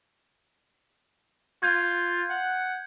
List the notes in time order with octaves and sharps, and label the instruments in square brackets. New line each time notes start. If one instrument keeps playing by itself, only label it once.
[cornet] F4 [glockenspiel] G6 G#6
[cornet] F#5